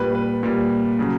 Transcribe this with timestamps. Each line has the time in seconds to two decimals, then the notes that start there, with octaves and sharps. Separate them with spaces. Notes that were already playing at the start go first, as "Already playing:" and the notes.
Already playing: A#2 G3 B4
0.15 B4
0.43 A#2 G3
0.99 C#3 F#3